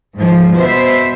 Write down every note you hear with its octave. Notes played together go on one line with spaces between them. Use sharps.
G#2 F3
B2 C5 E5